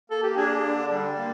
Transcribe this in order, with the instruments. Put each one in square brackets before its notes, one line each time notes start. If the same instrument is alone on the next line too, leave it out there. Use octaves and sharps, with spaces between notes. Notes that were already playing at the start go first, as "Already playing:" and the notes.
[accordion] A#3 [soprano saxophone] A4
[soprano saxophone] G4
[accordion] D4 [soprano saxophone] G#4
[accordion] D3
G3
A#3